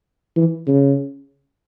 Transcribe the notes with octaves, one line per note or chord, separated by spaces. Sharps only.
E3
C#3